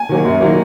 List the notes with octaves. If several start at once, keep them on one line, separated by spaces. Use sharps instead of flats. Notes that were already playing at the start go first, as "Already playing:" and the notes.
Already playing: G#5
D#3 F#3 A#3
F#2
D#3 F#3 A#3